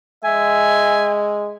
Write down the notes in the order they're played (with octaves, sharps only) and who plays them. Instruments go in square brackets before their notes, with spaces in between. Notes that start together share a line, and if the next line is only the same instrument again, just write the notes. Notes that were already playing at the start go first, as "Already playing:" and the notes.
[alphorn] G#3 [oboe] E5 [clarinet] G#5